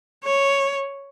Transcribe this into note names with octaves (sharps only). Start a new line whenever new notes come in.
C#5